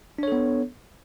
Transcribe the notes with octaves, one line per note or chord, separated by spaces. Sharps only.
B3 D4 A4 C#5